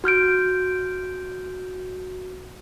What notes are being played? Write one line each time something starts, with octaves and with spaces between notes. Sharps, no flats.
F#4 F6 G6 D7